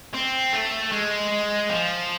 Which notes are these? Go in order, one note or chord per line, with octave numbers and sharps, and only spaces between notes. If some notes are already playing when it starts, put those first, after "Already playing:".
C4
A3
G#3
F3